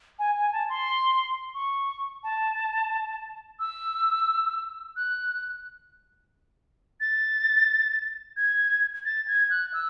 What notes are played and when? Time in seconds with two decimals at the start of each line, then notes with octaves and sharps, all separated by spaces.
0.19 G#5
0.35 G#5
0.53 A5
0.69 C6
1.54 C#6
2.23 A5
3.59 E6
4.96 F#6
7.00 A6
8.37 G#6
9.05 A6
9.27 G#6
9.50 F#6
9.74 E6